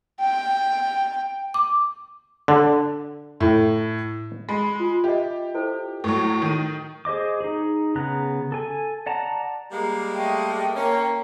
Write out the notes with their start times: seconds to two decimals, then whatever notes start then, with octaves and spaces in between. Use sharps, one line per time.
0.21 G5
1.54 D6
2.48 D3
3.40 A2
4.49 G#3 B5
4.80 F4
5.04 G4 D#5 E5
5.55 E4 A4 C5
6.04 A2 F#3 A4
6.42 D#3 D#7
7.05 G#4 C5 D#5 D6
7.41 D#4 G#4
7.95 C#3 B3 A#5 F#6
8.52 A4 G#5
9.06 D5 F#5 A5 A#5
9.72 G3 G#3 A#3 A#5
10.14 A3 D#5 G5
10.76 A#3 C#4